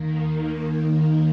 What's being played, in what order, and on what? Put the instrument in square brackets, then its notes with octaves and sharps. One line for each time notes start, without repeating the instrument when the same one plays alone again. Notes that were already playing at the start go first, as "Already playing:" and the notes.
Already playing: [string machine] D#2 D#3 A#3